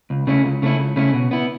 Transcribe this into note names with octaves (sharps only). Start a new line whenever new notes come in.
C#2
C#3 A3 C#4 E4
C#2
C#3 A3 C#4 E4
C#2
C#3 A3 C#4 E4
B2
B3 E4